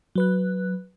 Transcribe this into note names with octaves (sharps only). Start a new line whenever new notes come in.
F#3 B4 F#6